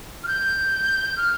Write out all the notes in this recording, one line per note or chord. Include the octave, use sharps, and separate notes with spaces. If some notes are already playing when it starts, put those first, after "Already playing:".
F6
G6
F6